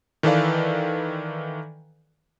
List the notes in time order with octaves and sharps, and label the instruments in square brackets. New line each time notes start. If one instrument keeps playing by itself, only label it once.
[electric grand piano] D#3 E3 A4 B4 D5 F5